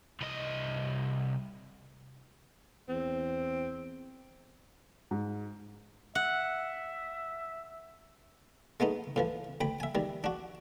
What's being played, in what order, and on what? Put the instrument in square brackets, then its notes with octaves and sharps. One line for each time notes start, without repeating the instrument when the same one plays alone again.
[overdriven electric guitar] C2 D#5
[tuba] E2 [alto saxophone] C4
[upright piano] G#2
[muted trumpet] E5 [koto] F#5
[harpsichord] G#3 A3 B3 D#4
A2 E3 F3
D2 G5 B5
E5 G#5
D#3 G3
D4 F#4